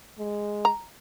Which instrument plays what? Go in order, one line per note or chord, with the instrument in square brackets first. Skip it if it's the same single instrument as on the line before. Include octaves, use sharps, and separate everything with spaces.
[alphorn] G#3
[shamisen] A#5